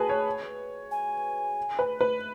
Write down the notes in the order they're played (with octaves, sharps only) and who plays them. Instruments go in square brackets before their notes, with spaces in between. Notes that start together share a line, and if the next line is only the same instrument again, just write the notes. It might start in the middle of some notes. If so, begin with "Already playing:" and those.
Already playing: [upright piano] F#4 G#4 B4 [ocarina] A5
[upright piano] C#5
[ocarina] G#5
[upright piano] B4
B4